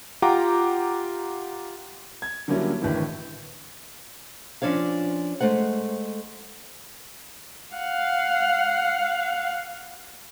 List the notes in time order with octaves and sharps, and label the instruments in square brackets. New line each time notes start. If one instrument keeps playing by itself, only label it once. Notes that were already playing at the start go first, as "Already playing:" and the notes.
[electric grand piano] F4 G4 F#5 G5 A#5 D6
[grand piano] G#6
D3 F#3 G3 A#3 C#4 E4
G#1 A2 D3 E3
[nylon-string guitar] F3 C#4 D4 C#5 F5
G#3 A3 C5 F#5
[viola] F5 F#5